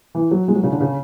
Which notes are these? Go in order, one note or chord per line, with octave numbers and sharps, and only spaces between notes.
E3
F#3
G#3
F#3
C#3
D3
C#3